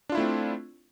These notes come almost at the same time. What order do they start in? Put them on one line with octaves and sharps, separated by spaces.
D4 F4 E4 A3 C4